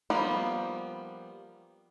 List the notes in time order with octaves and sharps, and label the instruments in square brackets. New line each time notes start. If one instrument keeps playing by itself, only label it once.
[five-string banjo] F3 G3 A#3 B3